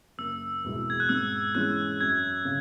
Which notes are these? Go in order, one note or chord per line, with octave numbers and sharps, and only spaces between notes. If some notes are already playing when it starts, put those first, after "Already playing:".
F#1 E6
E2 B2 G#3 E4
G#6
F#6
G#2 E6
E3 G#3 C#4 F#6
F#2 G#6
C#3